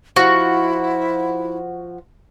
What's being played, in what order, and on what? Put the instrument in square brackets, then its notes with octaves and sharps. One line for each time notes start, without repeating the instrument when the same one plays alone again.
[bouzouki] F3 [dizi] E4 [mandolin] F#4